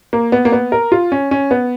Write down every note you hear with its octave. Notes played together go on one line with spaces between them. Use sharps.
A#3
B3
A#3
B3
A#4
F4
C#4
C#4
B3